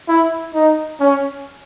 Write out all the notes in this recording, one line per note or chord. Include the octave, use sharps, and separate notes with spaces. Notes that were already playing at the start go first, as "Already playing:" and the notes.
E4
D#4
C#4